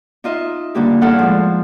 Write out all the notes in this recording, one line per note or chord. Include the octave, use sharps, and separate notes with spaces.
D#4 F4 D#5 E5
G2 D3 A#3 G4
E2 A2 D4 A4 F5 F#5
F3 G#3